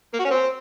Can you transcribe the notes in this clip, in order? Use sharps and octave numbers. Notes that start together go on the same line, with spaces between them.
A#3
F#4
C#4
C4